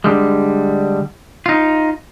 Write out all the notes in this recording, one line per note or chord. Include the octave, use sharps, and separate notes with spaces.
D3 G3 G#3
D#4 F4